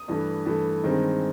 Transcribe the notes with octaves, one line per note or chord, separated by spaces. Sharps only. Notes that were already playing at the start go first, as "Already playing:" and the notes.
Already playing: D#6
G2 E3 A3
G2 E3 A3
G2 D#3 G#3 C4